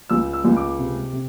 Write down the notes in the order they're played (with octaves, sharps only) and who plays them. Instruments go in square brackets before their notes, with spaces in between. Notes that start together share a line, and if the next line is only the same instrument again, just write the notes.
[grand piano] C#2 E6
E6
C#2
D6
C3
C3